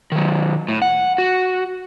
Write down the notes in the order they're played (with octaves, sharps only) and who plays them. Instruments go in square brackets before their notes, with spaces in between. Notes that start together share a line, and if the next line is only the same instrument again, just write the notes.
[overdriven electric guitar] D#3 F#3
A2
F#5
F#4